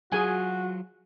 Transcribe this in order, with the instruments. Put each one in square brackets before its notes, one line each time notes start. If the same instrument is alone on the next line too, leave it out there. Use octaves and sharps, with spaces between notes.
[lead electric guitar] F#3 F4 [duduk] F#4 [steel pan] G#4 G#5